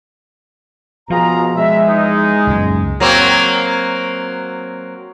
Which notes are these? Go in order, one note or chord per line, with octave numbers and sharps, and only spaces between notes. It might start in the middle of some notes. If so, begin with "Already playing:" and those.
B2 F3 F4 G#4 A#5
G#3 E5
E2 D#4
C#2 F#2 A#2
F#3 A#3 C4